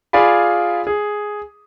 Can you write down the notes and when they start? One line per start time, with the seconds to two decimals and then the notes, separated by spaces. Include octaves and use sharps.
0.13 F4 G#4 D5 F5 G#5 B5
0.87 G#4